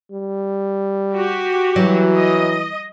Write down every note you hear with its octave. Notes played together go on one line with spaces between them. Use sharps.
G3
F#4 G4
E3 F#3
D#5